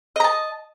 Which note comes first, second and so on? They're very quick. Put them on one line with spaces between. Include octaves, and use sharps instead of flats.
D#5 A#5 A5